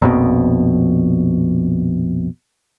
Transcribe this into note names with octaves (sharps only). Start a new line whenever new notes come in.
A#1 F2 B2